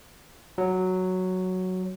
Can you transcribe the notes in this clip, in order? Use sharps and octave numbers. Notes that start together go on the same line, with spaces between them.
F#3